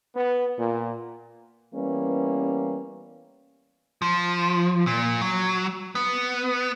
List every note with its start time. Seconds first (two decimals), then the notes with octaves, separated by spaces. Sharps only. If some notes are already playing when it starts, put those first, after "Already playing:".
0.14 B3
0.57 A#2
1.75 E3 G3 A#3 B3 C#4
4.02 F3
4.87 A#2
5.21 F#3
5.95 B3